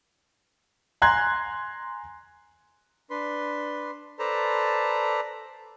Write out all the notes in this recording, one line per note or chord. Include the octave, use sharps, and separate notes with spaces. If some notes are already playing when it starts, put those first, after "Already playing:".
G#5 A#5 C6 F#6 G#6
D4 B4 C6
A4 B4 C5 D5 A5 A#5